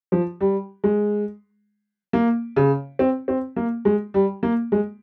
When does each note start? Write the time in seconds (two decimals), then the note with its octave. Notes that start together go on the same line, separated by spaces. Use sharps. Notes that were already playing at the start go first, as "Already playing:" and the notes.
0.12 F3
0.41 G3
0.84 G#3
2.13 A#3
2.56 C#3
2.99 C4
3.28 C4
3.56 A#3
3.85 G#3
4.14 G3
4.43 A#3
4.72 G#3